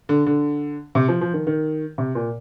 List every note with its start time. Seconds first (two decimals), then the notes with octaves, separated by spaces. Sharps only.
0.09 D3
0.26 D3
0.95 C3
1.08 F3
1.21 F3
1.34 D#3
1.47 D#3
1.98 C3
2.15 A#2